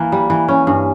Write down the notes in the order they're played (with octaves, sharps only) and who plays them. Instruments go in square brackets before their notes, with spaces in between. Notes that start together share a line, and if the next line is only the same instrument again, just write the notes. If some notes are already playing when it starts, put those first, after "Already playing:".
Already playing: [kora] E3 A#3
G3
E3
C#4
G2